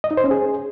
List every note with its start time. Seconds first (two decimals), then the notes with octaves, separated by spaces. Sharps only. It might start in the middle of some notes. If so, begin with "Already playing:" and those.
0.04 D#5
0.11 D#4
0.17 C5
0.24 C#4
0.31 G#4